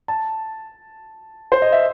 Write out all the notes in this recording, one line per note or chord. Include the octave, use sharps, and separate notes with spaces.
A5
C5
D#5
E5